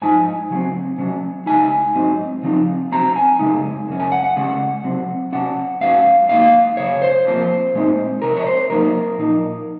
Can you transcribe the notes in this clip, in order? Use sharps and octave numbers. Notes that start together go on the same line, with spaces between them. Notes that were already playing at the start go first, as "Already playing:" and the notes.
G#2 F3 D#4 G#5
C#3 F#3 C4
C3 F#3 C#4
C#3 G#3 D#4 G#5
G#2 F#3 C4 D#4
C#3 F3 C4 D#4
C3 F#3 C4 A#5
G#5
F#2 C#3 G#3 D#4
F#2 C#3 C#4
G#5
F#5
F#5
C#3 G#3 C#4
C3 F#3 C4
C3 F#3 C#4 F#5
G#2 F#3 C#4 F5
G#2 F#3 A#3 D#4 F5
F#2 C#3 C#5
C5
F2 C3 F3 A#3
A#2 G#3 C4 D#4
F2 C3 A#4
C#5
C5
C3 F#3 A#3 D#4 A#4
A#2 F3 A#3 D#4